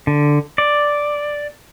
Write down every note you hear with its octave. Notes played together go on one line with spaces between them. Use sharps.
D3
D5